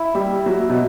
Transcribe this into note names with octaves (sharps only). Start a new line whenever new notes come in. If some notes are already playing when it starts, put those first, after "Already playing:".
Already playing: E4
G3 E5
F#3 E5
B2